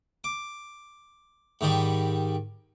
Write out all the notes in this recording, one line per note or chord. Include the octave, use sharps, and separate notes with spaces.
D6
G#2 D#3 G3